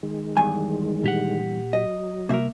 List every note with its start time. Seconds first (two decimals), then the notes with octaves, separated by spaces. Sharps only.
0.03 D#3 G#3
0.37 E2 G2 G#5
1.03 A#2 G4 F#5
1.73 F#3 D#5
2.29 C2 A#3 A#4 E5